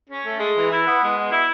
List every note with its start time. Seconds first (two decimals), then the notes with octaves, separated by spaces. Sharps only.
0.09 C#4
0.25 A3
0.40 G#3
0.56 E3
0.71 E4
0.86 B3
1.02 G#3
1.17 B2
1.32 E4